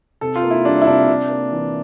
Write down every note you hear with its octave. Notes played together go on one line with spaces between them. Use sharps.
C3 A4
F4
A#3
E4
G3 D4
E4
C3 D4
C3
A#3
E3